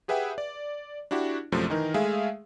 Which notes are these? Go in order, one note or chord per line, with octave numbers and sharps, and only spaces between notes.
G4 G#4 B4 E5 F#5 G5
D5
D4 E4 F#4 G4
A#1 F#2 C3 F3 A3
D#3 E3 D#4 A#4
G#3 A3 G#4 E5 F5